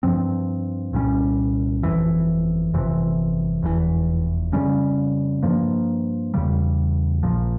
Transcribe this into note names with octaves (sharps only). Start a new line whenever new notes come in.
G2 F3 C4
C2 A#2 G3 C#4
G1 F2 E3
G1 F2 C3 E3
F1 E2 C3 E3
F2 C#3 G3 C#4
G2 F3 A#3
E2 C#3 G3
A#1 A#2 F3